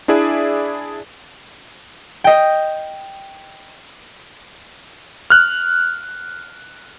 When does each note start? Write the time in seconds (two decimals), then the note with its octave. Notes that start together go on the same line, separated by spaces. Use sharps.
0.08 D4 E4 G#4 D5 E5
2.24 D#5 G5
5.30 F6 F#6